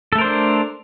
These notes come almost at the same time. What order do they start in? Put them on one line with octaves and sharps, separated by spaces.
A4 A3 A#4 C5 D4